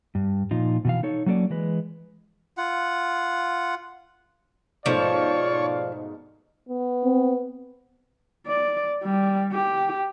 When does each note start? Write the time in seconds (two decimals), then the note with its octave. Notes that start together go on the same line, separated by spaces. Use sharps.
0.15 G2
0.51 A#2 F3 D#4 F4
0.85 B2 E3 F5
1.03 D#4 A4 C#5
1.26 F#3 A#3 C#4 A4 A#4 D5
1.50 E3 G#3 B4
2.57 F4 F#5
4.86 G#2 B2 F3 A3 F4 C#5 D5 F5
6.69 B3
7.04 C4
8.47 D5
9.03 G3
9.52 G4